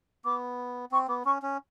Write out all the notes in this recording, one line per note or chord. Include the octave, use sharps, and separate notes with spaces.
B3 D6
C4 C#6
B3 D6
C#4 C#6
C#4